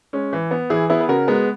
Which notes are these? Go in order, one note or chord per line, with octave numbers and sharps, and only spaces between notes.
G#3 C#4
E3
B3
E3 E4 G#4
B3 E4 G#4
B4
C#3 F#4 A#4
G#3 B3